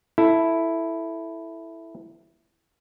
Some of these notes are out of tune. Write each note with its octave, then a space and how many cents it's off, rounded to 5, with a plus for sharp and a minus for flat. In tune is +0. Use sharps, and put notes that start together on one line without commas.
E4 +0 A4 +0